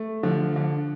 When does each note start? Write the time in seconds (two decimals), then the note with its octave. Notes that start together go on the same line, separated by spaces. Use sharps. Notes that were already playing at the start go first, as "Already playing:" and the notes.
Already playing: A3
0.23 D3 F3
0.56 D3